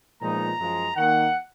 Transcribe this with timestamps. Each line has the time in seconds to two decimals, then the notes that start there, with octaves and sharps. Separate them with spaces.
0.21 A#2 F3 G#3 B3 D#4 A#5
0.59 F#2 F3 G#3
0.96 D#3 A#3 D#4 F#5